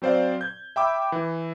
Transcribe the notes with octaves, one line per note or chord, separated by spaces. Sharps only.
F#3 C4 C5 D5 F5
G6 G#6
E5 G5 B5 D6 E6
E3